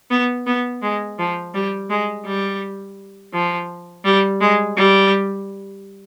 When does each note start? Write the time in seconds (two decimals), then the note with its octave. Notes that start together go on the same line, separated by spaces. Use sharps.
0.11 B3
0.47 B3
0.82 G#3
1.18 F3
1.54 G3
1.90 G#3
2.25 G3
3.33 F3
4.05 G3
4.41 G#3
4.77 G3